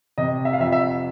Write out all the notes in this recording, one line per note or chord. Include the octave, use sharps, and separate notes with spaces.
C3 D#5
E5
F5
F2 E5
E5